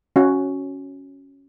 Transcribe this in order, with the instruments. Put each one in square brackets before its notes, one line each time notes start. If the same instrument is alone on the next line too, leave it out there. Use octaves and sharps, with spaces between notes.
[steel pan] C#4 F#4